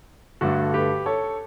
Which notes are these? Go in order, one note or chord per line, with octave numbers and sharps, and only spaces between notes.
G2 D3 A3 F#4 A4
G4 B4
A4 C#5